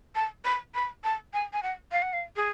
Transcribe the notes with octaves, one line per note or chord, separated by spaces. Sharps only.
A5
B5
B5
A5
G#5
G#5
F#5
F5
F#5
F5
G#4